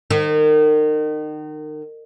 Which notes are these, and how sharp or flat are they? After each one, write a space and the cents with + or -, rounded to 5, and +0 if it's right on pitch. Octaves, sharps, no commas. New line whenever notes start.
D#3 -30